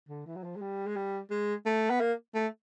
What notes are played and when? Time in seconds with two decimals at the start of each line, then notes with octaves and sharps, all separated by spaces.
0.09 D3
0.26 E3
0.36 F#3
0.44 F3
0.56 G#3
0.61 G3
0.87 G#3
0.96 G3
1.30 G#3
1.66 A3
1.90 B3
2.01 A#3
2.35 A3